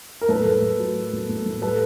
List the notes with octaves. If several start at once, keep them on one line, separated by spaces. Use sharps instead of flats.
A#4
A2 A4 B4
A2
A2
F#3
F#3
A2
A2
A2
G3 A4 B4